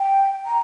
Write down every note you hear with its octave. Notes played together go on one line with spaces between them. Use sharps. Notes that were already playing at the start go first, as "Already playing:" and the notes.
Already playing: G5
A#5